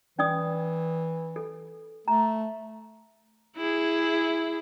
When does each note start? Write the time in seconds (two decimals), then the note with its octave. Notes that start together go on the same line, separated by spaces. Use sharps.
0.19 E3 C#4 D5 D#6
1.36 A4
2.08 A3 A#5
3.57 E4 G#4